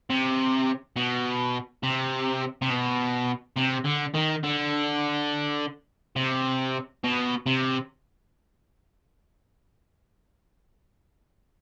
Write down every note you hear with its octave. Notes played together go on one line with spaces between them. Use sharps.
C3
B2
C3
C3
B2
C3
D3
D#3
D3
C3
B2
C3